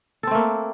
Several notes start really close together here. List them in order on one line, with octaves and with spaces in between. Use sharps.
A4 C4 A3 A#3